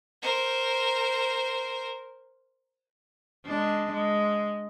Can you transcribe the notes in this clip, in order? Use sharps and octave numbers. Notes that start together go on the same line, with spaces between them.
A#4 C5
G#3 D4
G#3